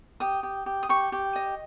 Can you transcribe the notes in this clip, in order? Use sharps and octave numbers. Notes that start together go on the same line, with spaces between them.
G4 D#6
G4
G4
D#6
G4 C#6
G4
D#5